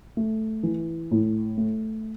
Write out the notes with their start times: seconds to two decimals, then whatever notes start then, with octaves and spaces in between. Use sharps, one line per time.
0.17 A3
0.63 E3
1.11 A2
1.57 A3